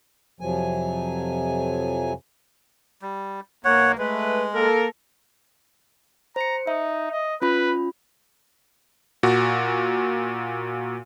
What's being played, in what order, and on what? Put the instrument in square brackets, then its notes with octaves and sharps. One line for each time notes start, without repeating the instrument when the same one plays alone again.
[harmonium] F2 C3 F3 F#3 G#5
[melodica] G3
[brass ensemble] B1 A#3 [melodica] C#5 F#5
[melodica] G#3 [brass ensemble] A3 B4
[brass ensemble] A#3 A4 A#4
[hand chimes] C5 C#7 [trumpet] A#5
[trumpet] D#4 [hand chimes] E5
[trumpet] D#5
[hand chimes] C#4 F4 B5 [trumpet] B4
[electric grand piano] A#2 F#4